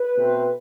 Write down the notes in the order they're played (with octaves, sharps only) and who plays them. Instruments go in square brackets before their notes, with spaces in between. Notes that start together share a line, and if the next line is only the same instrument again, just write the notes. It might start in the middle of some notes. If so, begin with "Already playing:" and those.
Already playing: [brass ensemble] B4
B2 A3 C4